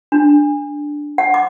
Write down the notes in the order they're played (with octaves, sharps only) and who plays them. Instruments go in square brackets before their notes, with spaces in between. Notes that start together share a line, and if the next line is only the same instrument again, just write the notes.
[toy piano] D4
F#5
D6